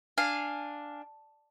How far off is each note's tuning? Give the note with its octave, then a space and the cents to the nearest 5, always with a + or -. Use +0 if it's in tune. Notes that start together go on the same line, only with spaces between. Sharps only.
D4 +0 F5 +0 G#5 -5